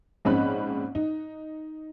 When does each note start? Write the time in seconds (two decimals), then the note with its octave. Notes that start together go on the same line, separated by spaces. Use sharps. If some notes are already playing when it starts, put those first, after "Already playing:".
0.25 A#1 G#2 C4 C#4 B5 F#6
0.95 D#4